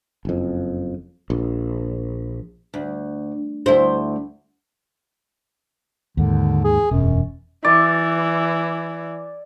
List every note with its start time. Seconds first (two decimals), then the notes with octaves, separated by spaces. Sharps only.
0.25 F#1 F2
1.30 A#1
2.74 D2
3.66 D2 E4 C5
6.17 D#2 G#2 D3
6.64 G#4
6.91 E1 F#2
7.65 E3 D5